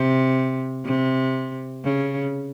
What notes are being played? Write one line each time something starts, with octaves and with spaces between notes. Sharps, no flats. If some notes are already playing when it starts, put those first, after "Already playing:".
Already playing: C3
C3
C#3